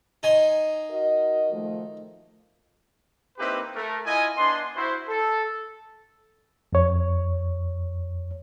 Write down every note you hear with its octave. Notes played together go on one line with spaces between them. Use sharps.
D#4 G#5 C6
F#4 A#4 D#5
D#3 F3 A3
A#3 C4 D#4 E4 G4 B4
A3 A#4
E4 F4 D#5 G#5
B3 D4 D#5 C6
E4 F#4 C5
A4
F2 C#5